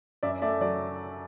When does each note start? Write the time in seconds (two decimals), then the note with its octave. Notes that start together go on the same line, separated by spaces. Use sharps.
0.23 F#2 D5 E5
0.42 A3 D5 E5
0.61 F#3 D5